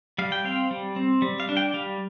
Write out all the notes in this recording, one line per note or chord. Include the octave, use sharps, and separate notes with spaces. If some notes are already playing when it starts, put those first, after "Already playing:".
G3 F5
G5
C4 F5
G3
C4
G3
F5
D4
G5
G3 F5